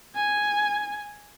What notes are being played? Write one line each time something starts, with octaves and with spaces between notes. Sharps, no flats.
G#5